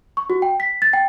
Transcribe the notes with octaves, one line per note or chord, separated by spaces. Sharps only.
C#6
F#4
G5
B6
A6
G5